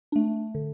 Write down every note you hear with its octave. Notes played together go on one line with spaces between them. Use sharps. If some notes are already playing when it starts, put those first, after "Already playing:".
A3 D4
D3